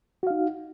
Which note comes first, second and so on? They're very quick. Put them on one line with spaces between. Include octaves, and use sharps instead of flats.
F#4 F5 D#4